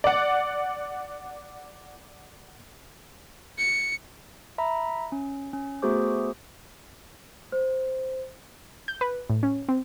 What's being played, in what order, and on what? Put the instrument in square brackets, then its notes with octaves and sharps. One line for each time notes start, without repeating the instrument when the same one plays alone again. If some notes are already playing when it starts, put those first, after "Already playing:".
[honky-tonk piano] D5 F#5
[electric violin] C#7
[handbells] E5 A#5 B5
C#4
C#4
A3 B3 F#4 G#4 C5 D6
[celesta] C5
[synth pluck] G6
B4
A2
C#4
C4